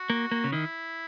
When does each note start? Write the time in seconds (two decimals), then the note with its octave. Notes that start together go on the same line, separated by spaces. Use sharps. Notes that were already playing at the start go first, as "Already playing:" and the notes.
Already playing: F#4
0.10 A#3
0.31 A#3
0.44 C#3
0.52 D#3 E4